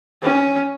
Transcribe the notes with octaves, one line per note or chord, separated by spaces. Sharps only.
C#4